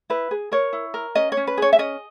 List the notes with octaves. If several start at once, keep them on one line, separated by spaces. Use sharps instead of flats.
E4 B4
G#4
A#4 C#5
E4
A#4
C#4 D#5
C#5
C#4
B4
G#4 C#5
E5
C#4 D#5